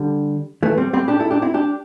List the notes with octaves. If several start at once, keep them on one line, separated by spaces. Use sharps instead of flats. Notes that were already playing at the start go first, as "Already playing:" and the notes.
Already playing: D3 G3
E3 A3
G3 C4
G3 C4
D4 G4
E4 A4
D4 G4
C4 E4
D4 G4